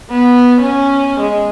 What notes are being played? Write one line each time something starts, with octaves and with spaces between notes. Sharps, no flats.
B3
C#4
G#3